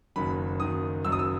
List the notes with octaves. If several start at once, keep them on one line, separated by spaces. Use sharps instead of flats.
F#1 F#2 D#3 F#3 B5
F#1 F#2 D#3 F#3 D#6
F#1 F#2 D#3 F#3 E6
D#6
E6